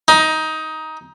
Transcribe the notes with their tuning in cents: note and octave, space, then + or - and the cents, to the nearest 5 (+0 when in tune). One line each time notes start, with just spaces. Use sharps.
D#4 +15